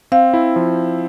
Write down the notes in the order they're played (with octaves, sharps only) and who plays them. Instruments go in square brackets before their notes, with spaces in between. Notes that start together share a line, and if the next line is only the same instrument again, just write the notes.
[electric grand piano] C4 [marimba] F5
[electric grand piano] E4
F3